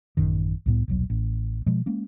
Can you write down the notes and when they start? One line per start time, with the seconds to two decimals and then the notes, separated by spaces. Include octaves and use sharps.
0.17 A1 F#2 D#3
0.66 C2 A2 B3
0.88 D#1 B1 F#3
1.10 A1
1.66 B2 F3 G#3
1.86 G#3 A#3 C#4